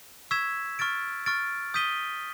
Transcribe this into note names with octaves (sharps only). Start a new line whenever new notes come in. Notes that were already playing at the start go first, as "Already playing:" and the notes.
C#6 E6 G#6 B6 E7
C#6 F6 A6 D7
C#6 F6 A6 D7
D#6 G6 B6 D#7 G7